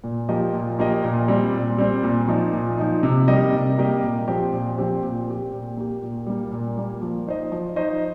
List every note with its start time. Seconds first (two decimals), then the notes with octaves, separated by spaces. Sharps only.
0.04 A#2
0.29 F3 A#3 G4 D#5
0.54 A#2
0.79 F3 A#3 G4 D#5
1.04 A#2
1.28 G3 C4
1.53 A#2
1.78 G3 C4
2.03 A#2
2.28 F3 D#4
2.53 A#2
2.78 F3 D#4
3.03 C3
3.28 G3 A#3 G4 D#5
3.53 C3
3.78 G3 A#3 G4 D#5
4.03 A#2
4.28 F3 C4 G4 C5
4.52 A#2
4.77 F3 C4 G4 C5
5.03 A#2
5.27 A#3 G4
5.52 A#2
5.77 A#3 G4
6.02 A#2
6.27 G3 A#3
6.52 A#2
6.77 G3 A#3
7.02 F3
7.27 D#4 C5 D#5
7.52 F3
7.76 D#4 C5 D#5